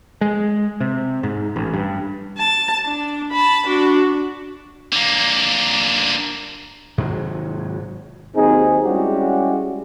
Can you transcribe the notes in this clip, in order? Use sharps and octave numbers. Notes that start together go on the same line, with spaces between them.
G#3
C3
G#2
A1
G2
A5
D4
A5 B5
D4 F#4
D3 A#3
G#2 C3 D#3 F#3
D#2 F#3 C4 D#4 G#4
G3 G#3 C#4 E4 F#4 G4